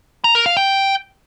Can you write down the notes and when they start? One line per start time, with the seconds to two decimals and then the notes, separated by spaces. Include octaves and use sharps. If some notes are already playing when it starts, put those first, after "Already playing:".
0.24 A#5
0.35 A#4
0.46 F5
0.57 G5